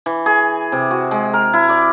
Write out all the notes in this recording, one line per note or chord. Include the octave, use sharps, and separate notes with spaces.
E3
G#4
C3
F#4
G#3
A#4
E4
D5